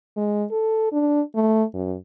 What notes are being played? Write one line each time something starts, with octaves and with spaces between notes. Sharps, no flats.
G#3
A4
D4
A3
F#2